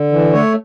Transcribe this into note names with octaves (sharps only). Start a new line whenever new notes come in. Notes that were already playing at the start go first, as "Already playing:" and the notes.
Already playing: D3
E3
A3 C#5